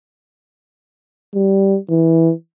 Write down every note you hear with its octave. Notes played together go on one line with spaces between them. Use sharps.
G3
E3